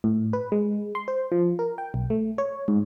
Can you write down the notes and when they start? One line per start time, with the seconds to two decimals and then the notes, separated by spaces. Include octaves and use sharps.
0.04 A2
0.33 B4
0.52 G#3
0.95 C6
1.08 C5
1.32 F3
1.59 A#4
1.78 G5
1.94 B1
2.10 A3
2.38 C#5
2.68 G#2